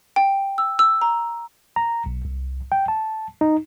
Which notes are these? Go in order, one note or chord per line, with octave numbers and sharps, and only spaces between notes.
G5
E6
E6
A#5
A#5
B1
C2
G5
A5
D#4